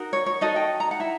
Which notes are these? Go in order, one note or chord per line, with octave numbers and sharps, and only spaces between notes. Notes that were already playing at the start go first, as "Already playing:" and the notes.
Already playing: D#4 F#4 A#4
C#5
C#5
D#4 F#4 A4 D#5
G5
A#5
F#5
E4 E5